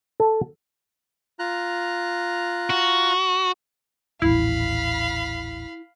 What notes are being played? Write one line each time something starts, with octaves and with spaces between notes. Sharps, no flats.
A4
F4 A#5 F#6
F#4
D#1 A1 E4 F5 B5